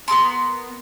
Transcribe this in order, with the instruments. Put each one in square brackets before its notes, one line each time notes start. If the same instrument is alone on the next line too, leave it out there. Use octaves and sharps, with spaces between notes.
[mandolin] B3 G#4 A#4 C6